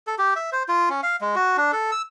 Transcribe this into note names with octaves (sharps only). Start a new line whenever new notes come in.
A4
G4
E5
C5
F4
C#4
F5
G#3
F#4
D4
A4
E6